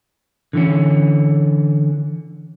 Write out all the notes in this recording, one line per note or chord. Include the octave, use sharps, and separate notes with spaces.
D3 E3 C#4